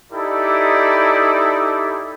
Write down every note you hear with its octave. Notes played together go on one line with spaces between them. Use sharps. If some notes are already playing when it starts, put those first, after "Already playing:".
D#4 E4 G4 A4 D5